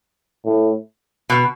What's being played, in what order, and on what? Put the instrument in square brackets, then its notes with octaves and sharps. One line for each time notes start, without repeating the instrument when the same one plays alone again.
[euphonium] A2
[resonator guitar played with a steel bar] B2